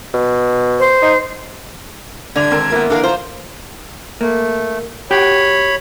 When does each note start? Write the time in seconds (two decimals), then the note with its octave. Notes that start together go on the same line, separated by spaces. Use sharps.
0.14 B2
0.79 C5
1.02 D#4
2.36 C2 D3 D4 G#6 F7
2.51 G#1 C4 A#4
2.72 A#3 B3 E4
2.90 D3 E3 D4 A4 A#4 F5
3.03 F4 C5 A#5
4.21 A3 A#3
5.11 F#4 G4 C#5 G5 B5